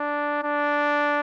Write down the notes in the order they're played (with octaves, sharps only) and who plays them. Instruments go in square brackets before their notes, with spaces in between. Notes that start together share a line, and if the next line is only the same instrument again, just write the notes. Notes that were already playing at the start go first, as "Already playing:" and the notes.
Already playing: [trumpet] D4
D4